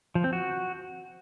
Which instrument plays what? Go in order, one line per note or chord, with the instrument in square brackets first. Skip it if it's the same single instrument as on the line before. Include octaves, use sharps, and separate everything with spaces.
[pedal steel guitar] F3
C4
F#4